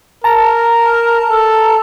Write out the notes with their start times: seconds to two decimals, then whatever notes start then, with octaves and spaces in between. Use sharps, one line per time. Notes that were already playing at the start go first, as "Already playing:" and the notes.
0.24 A#4 A5 A#5
1.31 A4